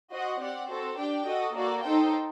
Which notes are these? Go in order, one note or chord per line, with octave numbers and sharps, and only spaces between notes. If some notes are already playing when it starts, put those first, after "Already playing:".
F#4 C5 D#5 F#5
C4 G4 D5 F#5
C4 F#4 A4 C5
D4 G4 D5 G5
F#4 A4 D#5
A#3 F#4 A4 D5
D#4 A4 C5 G5